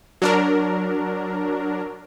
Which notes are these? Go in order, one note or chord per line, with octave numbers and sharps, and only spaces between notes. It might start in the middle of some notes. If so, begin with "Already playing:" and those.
F#3 D4 A#4